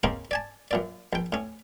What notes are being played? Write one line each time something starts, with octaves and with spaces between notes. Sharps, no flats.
C#3 A#3 C4 C#4 D#4 A#4
D5 G#5 A5
F#2 A#2 D5
A#1 G5
A2 C#4